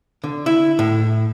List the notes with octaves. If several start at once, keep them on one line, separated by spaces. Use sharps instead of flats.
D3
E4
A2